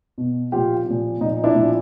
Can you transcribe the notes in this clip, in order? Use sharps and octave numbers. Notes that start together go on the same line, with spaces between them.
B2
A#2 F3 F4 G4
A#2 F3
A#2 F3 D#4
D4 E4
A#2 F3